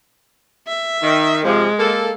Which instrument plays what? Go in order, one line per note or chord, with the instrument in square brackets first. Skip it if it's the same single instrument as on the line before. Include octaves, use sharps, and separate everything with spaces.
[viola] E5
[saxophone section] D#3
[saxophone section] C3 F3 [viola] G#3
[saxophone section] A#3 A4